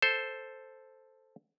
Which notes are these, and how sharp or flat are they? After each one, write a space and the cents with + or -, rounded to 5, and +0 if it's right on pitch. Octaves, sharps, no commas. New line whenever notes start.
A4 +0 C5 +0